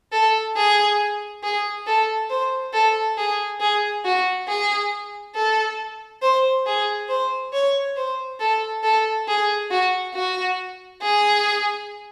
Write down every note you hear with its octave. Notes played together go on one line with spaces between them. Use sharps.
A4
G#4
G#4
A4
C5
A4
G#4
G#4
F#4
G#4
A4
C5
G#4
C5
C#5
C5
A4
A4
G#4
F#4
F#4
G#4